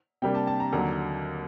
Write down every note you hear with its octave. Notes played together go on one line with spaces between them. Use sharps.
C3 G3 A#3 D4 G5
A5
A5
A#5
D#2 D3 F#3 A#5